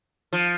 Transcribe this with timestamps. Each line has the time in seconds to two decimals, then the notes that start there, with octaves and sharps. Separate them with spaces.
0.33 F3